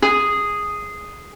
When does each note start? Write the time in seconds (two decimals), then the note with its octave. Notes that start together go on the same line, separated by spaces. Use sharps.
0.02 G#4